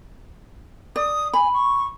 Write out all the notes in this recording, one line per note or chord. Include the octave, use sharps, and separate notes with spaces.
D5 D#6
G#5 B5
C#6